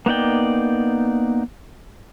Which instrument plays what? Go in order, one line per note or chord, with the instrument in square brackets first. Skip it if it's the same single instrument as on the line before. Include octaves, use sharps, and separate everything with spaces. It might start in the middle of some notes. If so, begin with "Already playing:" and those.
[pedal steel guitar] A#3 B3 D#4 D5 G5